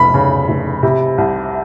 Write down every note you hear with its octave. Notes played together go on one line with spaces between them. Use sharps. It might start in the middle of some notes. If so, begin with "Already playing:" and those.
Already playing: F1 F2 B5
C#3
F1
C3
C2